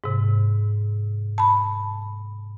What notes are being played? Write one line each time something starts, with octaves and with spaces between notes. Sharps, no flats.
G#2 C3
A5 B5